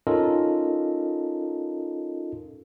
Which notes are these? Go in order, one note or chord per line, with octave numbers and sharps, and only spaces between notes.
C#4 D#4 F4 A4 A#4 D#5